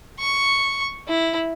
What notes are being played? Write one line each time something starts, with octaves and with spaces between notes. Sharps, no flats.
C#6
E4